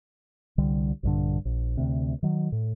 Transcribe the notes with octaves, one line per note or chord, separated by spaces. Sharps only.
C2 D3 G3
A#1 G2 D3
A#1
D2 C3
D#3 F#3
A2